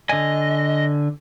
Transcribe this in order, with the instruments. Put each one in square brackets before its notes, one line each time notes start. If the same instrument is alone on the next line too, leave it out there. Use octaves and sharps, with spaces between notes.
[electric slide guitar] D3 G#5 [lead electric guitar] D#5